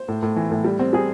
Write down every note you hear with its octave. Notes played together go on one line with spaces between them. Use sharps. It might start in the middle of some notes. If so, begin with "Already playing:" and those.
Already playing: C5
A2
A2
E3
A2
G3
C4
G3 G#4